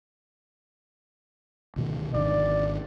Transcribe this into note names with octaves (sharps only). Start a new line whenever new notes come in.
D2 B2 D#3
G#1 D#3 D4 D5